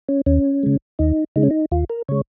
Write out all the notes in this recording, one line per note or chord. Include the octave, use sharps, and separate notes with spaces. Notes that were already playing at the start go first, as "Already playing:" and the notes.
C#4
D#2 C#4
C#3 G#3
D#2 D#4
C#3 G#3 D#4
C#4
D#4
D#2 F4
A#4
C#3 G#3 C#5